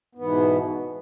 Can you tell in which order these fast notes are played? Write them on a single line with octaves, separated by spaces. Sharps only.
B3 G#2 E3 B2